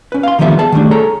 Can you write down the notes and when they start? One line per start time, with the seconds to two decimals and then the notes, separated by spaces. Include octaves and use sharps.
0.12 C#4 B4
0.23 F5 C6
0.39 D3 D#3 F3 G3 B3 E5
0.59 G#4 A5
0.72 D#3 G3 A3 D4
0.91 G#4 A4 C#5 A#5